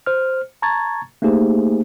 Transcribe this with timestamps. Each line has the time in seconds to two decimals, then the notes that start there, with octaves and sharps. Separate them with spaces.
0.06 C5 F6
0.62 A5 A#5 C#6 G#6 A6
1.22 A3 A#3 D#4 G4 G#4 C5